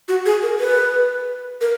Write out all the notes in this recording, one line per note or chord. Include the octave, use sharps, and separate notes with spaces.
F#4
G#4
A#4
B4
A#4